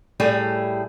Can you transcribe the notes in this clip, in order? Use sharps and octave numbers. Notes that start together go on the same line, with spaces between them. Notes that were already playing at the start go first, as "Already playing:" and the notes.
A2 G3 A3 G#4